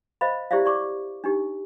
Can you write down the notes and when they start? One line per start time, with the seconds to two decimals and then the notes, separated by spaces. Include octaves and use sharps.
0.21 C5 D#5 F5 B5
0.51 E4 G4 C5 D5 E5 F5
0.65 D5 C#6 D6
1.24 D4 D#4 G4